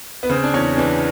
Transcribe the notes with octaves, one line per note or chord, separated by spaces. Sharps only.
B3
C#3 C4
D4
E2 C#4
E3 D4